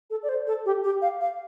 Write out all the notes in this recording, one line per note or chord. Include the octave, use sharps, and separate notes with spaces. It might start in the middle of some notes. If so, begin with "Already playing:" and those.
A4
D5
C5
A4
G4
G4
F5
F5